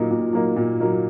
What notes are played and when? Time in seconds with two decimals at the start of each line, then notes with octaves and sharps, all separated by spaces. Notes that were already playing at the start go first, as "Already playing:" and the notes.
Already playing: A#2 F#3 A#3 D#4
0.10 A#2
0.33 F#3 A#3 D#4
0.56 A#2
0.80 F#3 A#3 D#4